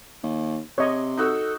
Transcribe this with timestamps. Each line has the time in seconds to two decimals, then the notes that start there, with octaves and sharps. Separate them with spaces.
0.23 D#2
0.78 C3 C#5 D#5
1.17 D#4 F#4 A4 E6